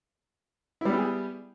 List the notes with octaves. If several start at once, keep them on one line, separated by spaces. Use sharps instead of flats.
G3 B3 E4 G4 G#4